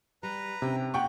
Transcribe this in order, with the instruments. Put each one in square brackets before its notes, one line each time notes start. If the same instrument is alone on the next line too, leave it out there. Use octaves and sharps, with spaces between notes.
[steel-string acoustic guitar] G3 [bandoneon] B4 A#5
[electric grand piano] C3 [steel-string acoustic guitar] C#4 D#4 G5
[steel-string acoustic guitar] A#3 F4 G4 [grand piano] F#5 G5 C#6